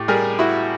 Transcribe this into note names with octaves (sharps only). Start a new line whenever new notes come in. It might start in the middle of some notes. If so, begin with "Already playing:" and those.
Already playing: A2 G4
G3 G#4 A#4
E4 F#4